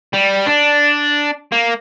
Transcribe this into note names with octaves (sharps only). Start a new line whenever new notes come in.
G3
D4
A#3